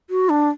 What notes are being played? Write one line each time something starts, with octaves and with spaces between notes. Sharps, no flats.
F#4
D4